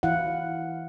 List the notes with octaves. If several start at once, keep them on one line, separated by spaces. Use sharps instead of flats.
E3 E4 F5 F#5